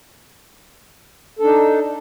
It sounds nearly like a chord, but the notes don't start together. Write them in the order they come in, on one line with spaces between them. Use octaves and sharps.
A4 D4 D#4